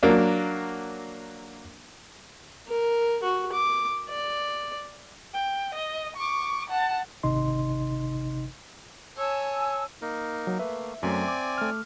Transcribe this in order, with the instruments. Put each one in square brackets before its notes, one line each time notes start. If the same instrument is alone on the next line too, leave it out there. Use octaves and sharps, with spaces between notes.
[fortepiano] F#3 A#3 D4
[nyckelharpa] A#4
F#4
D6
D5
[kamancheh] G5
D#5
C#6 D6
F#5 A5
[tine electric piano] G#1 C3 D#4 D#5 C6
[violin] C#5 [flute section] G#5 A5 E6
[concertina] A#3 D#4 A#4
[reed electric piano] F#3
[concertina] A3 A#3 [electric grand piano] B4 [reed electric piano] E5
[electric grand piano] F#2 F#3 A3 [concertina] C4 D5 G#5
[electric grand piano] D6
[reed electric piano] A3 F6